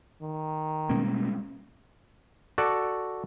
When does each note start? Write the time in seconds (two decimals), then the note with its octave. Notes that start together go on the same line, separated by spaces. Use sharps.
0.22 D#3
0.89 B2 G3 G#3 A#3 C#4
2.58 F#4 A4 D5